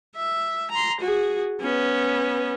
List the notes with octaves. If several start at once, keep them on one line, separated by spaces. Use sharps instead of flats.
E5
A#5 C6
F#4 G#4
B3 C#4